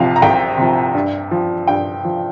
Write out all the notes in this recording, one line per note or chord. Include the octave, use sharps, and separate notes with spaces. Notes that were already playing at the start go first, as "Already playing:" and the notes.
Already playing: C2 C3 F3 F5
A#5
C2 G5
C3 F3
G2
F3
G2 G5
F3